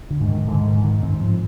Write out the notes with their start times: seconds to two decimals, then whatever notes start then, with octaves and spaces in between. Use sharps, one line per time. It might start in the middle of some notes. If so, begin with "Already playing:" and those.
0.11 D3
0.20 G#2
0.29 D#3
0.47 G#2 D3
0.65 D#3
0.75 G#2
0.84 D#3
1.03 G#2 C4
1.20 F3